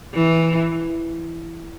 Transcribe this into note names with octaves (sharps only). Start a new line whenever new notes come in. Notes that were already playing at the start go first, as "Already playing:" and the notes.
E3